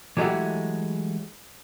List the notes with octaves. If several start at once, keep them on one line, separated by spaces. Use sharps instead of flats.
E3 F#3 G#3 A3 F#4 G4